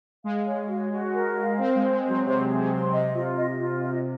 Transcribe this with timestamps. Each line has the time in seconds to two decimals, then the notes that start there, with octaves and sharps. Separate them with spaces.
0.24 G#3 F5
0.46 C#5
0.69 F#4
0.92 F#4
1.14 A#4
1.37 F5
1.58 C4 C5
1.75 G#3
1.81 C5
1.91 G#3
2.03 C5
2.09 F#3
2.25 C3 C5
2.48 G#4
2.59 C3
2.71 C6
2.92 C3 D#5
3.14 F4
3.37 D#5
3.59 F4
3.82 D#5